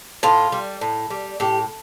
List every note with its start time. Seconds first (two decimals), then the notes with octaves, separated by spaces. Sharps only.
0.23 A2 F4
0.52 G3
0.81 A2
1.10 G3
1.40 A2 G4